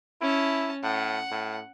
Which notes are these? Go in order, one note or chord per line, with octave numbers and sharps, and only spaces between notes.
C#4 E4 A5
A2 F#5
A2